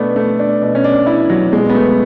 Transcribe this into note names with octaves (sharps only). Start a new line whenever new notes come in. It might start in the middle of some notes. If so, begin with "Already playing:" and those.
Already playing: B2 A3 B3 D4
A3
D4
B2
C#4
D4
E4
F#3
B2 G#3
B3
A3